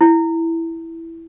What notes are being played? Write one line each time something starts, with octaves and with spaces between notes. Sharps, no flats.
E4